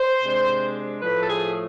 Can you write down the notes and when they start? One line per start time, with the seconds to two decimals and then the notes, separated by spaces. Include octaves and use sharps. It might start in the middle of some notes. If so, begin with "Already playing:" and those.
Already playing: C5
0.22 C3 G#3 D4
1.02 A2 F3 A3 B4
1.21 A4
1.28 G#4